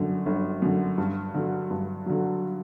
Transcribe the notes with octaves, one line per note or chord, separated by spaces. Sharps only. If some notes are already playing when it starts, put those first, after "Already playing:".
Already playing: G1 F#2 D3
G1
F#2 D3
G2
D3 F#3
G2
D3 F#3